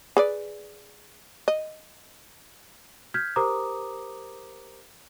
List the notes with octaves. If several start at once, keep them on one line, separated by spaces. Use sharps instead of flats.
G#4 B4 D5
D#5
F6 G6 G#6 B6
G4 A#4 C5 A#5 D6 D#6